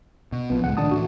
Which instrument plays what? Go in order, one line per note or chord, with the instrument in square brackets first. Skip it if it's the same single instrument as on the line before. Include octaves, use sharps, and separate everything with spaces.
[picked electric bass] B2
[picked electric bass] A#1 F3 [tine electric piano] B3
[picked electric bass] C#2 A2 G#3 [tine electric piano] F#5
[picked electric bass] A#2 D#3 A3 [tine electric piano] D4 A5 D#6
[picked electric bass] A2 E3 [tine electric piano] F#4